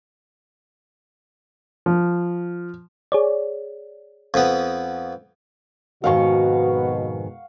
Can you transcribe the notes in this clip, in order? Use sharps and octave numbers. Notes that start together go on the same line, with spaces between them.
F3
G#4 C#5 D5
F2 B3
F2 G#2 B2 D#3 F#4 F5 F#5 C#6